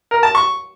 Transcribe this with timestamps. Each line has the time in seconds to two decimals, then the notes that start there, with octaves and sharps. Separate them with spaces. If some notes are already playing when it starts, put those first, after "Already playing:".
0.11 A#4
0.23 A5
0.35 C#6